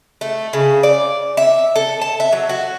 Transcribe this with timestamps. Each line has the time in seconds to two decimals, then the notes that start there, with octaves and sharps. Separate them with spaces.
0.21 A3
0.53 C#3
0.83 D5
1.37 E5
1.76 A4
2.01 A5
2.20 E5
2.32 F#3
2.49 F#4